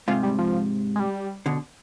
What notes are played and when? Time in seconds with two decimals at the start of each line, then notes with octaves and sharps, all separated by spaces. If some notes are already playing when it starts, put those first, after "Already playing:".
0.08 G#2 C3 F4
0.23 G3
0.39 F3
0.96 G#3
1.00 G3
1.46 B2 D3